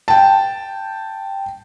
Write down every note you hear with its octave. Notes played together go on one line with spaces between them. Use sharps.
G5 A5